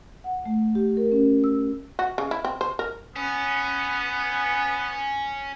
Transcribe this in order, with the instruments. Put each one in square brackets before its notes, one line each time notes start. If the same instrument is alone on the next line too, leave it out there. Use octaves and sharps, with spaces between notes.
[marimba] F#5
A3
G4
A#4
C#4
E6
[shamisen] F#4
C#3
E4
C4
C5
A#4
[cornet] B3 [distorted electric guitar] C#4